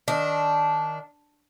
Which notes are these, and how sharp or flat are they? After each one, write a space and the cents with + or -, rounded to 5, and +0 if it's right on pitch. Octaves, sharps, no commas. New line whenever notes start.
D#3 +0 D4 -10